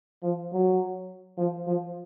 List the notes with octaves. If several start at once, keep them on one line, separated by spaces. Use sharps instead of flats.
F3
F#3
F3
F3